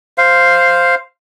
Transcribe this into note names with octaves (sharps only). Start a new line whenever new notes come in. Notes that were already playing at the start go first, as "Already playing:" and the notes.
C5 F5